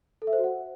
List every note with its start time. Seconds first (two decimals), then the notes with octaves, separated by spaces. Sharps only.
0.22 A4
0.27 E5
0.33 C5
0.38 F#4
0.44 F#5